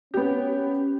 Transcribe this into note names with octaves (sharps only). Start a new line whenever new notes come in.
B3 C#4 G4